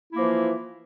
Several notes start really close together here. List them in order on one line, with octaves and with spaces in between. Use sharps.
E4 A#3 F3 E3